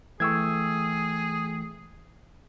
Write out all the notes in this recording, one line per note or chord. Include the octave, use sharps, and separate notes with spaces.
E3 A3 G#4 G5 C#6 E6 G#6